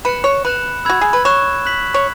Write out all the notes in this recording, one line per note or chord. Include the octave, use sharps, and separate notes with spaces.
B4 F#6 C#7 E7
C#5
B4 B5 F#6 E7
F#4 B5 E6 G#6
G#4
B4
C#5 C#6 F#6 E7
F#6 B6 F#7
C#5